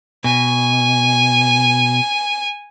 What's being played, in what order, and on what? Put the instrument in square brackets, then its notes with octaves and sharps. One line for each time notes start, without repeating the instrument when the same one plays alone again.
[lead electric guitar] B2 [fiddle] G#5